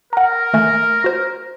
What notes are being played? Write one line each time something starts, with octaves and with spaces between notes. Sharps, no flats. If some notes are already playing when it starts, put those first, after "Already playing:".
A#4 F#5 A#5
D#3 A3 G#5
F#4 C5